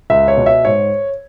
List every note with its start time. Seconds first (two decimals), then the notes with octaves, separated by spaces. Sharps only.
0.10 C#2 E5
0.28 C#5
0.37 B2
0.46 E5
0.65 G#2 C#5